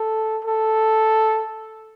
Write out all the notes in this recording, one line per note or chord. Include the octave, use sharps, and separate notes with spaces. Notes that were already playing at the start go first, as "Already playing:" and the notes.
Already playing: A4
A4